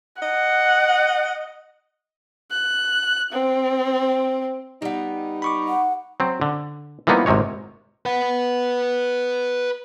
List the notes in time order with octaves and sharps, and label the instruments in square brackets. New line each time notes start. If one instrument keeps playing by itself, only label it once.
[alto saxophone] D#5 [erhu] F#5
[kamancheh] F#6
C4
[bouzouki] G3 B3 [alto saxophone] D#4
[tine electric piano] B5 C#6 D6
[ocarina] F#5
[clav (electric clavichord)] F#3 C4
D3
E3 F3 G3 A#3 B3 D#4
G#1 G#2 C3 G#3 C#5
[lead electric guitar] B4 F#5